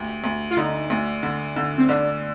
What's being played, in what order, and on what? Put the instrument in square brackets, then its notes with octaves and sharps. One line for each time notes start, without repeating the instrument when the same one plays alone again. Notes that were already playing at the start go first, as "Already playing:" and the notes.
Already playing: [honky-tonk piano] D2 G4
D2
[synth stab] F4
[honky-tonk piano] D3 [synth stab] D#4
[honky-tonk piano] D2
D3
D3
[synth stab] C4
[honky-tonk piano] D3 [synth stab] D4